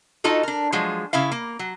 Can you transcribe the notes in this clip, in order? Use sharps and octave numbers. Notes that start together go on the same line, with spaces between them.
D#4 F4 F#4 A4 D#5
D4 A#4
F3 F#3 G#3
C#3 E4 E5 F5
A#3
F#3